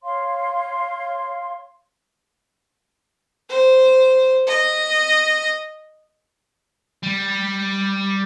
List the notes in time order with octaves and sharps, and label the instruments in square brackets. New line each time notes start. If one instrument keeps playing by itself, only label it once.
[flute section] C#5 F5 C6
[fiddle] C5
D#5
[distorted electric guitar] G3